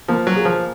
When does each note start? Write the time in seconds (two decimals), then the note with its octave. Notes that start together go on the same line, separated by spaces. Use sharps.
0.08 F3 A#3
0.27 F#3
0.36 G#4
0.45 F3